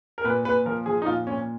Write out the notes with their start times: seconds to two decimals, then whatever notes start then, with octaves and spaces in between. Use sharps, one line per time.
0.18 A#4
0.24 A#2 B4
0.45 A#2 B4
0.66 F3 A#4
0.86 F3 G#4
1.02 D#4
1.06 A#2 F4
1.27 A#2 C#4